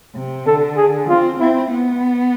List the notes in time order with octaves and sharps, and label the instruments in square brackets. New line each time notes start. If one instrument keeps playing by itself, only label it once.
[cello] C3
[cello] D3 [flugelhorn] A4
[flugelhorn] G#4
[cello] C4 [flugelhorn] F4
[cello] C4 [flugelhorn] E4
[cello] B3